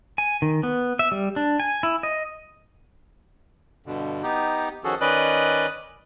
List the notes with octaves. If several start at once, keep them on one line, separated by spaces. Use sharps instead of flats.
G#5
D#3
B3
E5
G3
D4
G#5
E4
D#5
G2 B2 D3
B3 D#4 G4
D#3 F3 C#4 F#4 G#4 A4
D#3 C#4 B4 D5 D#5 F#6